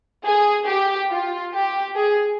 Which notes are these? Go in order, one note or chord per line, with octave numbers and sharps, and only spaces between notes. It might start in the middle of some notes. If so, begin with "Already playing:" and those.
G#4
G4
F4
G4
G#4